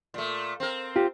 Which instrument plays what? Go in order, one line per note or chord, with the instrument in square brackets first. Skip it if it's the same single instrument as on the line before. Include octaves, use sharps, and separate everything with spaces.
[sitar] A#2 A3
C4 A#4
[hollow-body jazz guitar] F4 G4